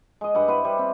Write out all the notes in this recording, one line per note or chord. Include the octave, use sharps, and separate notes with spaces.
G#3 D#5
G2 F#5 B5
E4 B4 C5 F#5
G3
C4